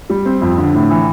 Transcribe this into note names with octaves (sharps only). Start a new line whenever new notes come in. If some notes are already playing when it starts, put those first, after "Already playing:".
G3
C4
F2
D3
A2
E3